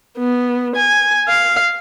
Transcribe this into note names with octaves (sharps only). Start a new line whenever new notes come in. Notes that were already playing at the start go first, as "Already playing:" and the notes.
B3
G#5
F5